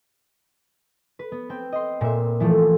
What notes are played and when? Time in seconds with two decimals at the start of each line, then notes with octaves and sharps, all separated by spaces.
1.19 B4
1.32 B3
1.49 C4 G5
1.72 D#5 C6
2.01 A#2 E5
2.40 E3 F3 A3